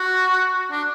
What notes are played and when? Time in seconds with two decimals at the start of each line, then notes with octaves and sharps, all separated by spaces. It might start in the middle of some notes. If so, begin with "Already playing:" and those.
Already playing: F#4
0.71 D4